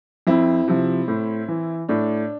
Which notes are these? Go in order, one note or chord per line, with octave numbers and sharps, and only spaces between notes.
F2 C4 E4
C3 F3
A2
E3
A2 D4